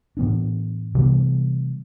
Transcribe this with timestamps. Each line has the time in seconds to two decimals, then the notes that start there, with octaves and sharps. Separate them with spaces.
0.17 A2 E3 B3 D4
0.95 C3 E3 G3 B3